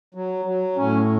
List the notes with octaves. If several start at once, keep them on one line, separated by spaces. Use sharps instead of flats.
F#3
F#3
A2 C#4